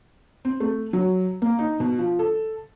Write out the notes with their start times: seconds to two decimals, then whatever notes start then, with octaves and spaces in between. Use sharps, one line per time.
0.45 C4
0.60 A3
0.93 F#3
1.42 A#3
1.59 D#4
1.80 B2
1.98 F3
2.19 A4